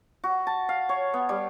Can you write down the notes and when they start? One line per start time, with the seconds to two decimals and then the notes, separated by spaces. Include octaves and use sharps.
0.24 F#4
0.47 A5
0.69 F5
0.89 C#5
1.14 B3
1.29 G3